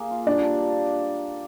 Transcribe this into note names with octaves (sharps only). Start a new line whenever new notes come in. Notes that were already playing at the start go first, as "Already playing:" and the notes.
Already playing: A#3 G#4
F4
G3 D4 D5
D4